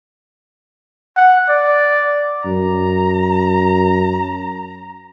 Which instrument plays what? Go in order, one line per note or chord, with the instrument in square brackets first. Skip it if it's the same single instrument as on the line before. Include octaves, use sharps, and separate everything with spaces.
[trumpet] F#5
D5
[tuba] F#2 [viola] A#5